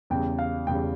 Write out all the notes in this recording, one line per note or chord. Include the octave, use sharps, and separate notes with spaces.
E2 C#3 G3 G5
F5
E2 C#3 G3 G5